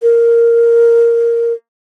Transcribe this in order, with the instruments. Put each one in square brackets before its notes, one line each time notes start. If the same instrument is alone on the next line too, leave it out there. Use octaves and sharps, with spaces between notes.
[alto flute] A#4